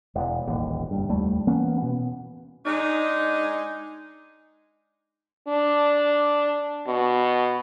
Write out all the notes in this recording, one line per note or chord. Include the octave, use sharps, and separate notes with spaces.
E1
D#1 A1 D#2
F#1 G2
F1 D#2 G3 A3
E3 A#3 B3 C#4
B2 B3
G#3 D4 D#4
D4
B2